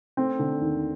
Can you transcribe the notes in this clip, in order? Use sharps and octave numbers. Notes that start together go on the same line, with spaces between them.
A3 C4
D3
D#2